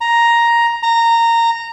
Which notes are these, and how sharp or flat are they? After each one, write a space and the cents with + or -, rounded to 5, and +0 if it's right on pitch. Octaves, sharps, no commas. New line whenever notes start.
A#5 +5
A#5 -15